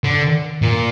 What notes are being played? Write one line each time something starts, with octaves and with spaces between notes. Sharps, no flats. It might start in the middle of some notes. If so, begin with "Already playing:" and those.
D3
A#2